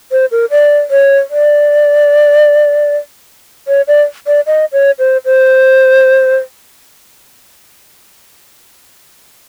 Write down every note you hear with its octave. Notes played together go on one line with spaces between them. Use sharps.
C5
A#4
D5
C#5
D5
C#5
D5
D5
D#5
C#5
C5
C5